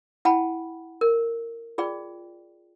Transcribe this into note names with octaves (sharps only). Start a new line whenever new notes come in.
E4 F#5 G5 A5 B5
A#4
F4 G#4 D5 G5